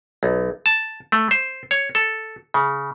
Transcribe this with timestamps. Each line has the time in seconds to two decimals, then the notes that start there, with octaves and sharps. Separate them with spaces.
0.23 B1
0.66 A5
1.12 A3
1.31 C5
1.71 C#5
1.95 A4
2.54 C#3